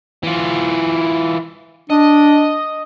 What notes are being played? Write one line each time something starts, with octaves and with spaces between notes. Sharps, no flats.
E3 F4
D4 D#5